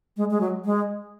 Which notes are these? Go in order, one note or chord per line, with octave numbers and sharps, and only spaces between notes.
G#3
G#3
F#3
G#3